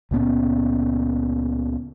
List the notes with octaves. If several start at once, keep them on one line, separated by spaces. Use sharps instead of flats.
C#2 A#2 B3 C#4